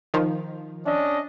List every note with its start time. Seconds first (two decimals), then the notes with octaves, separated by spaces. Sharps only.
0.14 D#3 F3
0.86 C#4 D4 D#5